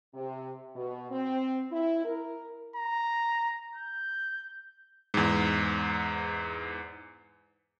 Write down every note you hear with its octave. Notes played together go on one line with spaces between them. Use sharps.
C3
B2
C4
E4
A#4
A#5
G6
E2 G#2